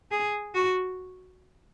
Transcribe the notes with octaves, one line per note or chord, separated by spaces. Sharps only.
G#4
F#4